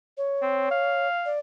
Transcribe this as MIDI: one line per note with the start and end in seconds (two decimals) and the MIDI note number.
0.18 1.08 73
0.42 0.69 60
0.71 1.33 77
1.26 1.39 74